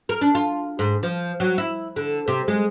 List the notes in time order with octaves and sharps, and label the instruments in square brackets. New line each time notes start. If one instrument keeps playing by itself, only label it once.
[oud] A#4
D4
F4
G#2
F3
F#3
E4
D3
C3
G#3